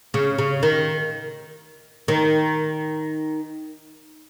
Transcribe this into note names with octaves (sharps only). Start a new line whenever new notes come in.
C#3
C#3
D#3
D#3